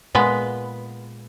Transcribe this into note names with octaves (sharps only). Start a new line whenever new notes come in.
A#2 G#3 B3 B4